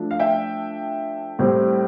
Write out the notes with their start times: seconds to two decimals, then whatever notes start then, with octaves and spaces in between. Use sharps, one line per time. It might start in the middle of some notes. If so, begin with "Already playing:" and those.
Already playing: F3 A3 D4
0.11 F5
0.20 E5 G5
1.39 A2 G3 C4